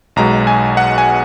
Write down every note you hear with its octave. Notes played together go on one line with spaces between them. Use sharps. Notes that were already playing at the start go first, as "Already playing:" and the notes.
B1 B2 G#3 A#5
G#5
F#5
G#5